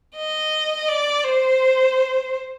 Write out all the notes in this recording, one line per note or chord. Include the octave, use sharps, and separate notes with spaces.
D#5
D5
C5